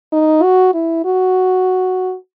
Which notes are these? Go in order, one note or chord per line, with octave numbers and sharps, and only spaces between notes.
D#4
F#4
E4
F#4